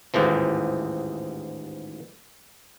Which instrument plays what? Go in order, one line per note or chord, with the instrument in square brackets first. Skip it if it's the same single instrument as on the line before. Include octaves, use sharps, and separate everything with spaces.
[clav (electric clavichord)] A1 D#2 G#2 E3 F3